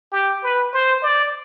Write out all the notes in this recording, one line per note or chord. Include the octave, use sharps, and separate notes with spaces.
G4
B4
C5
D5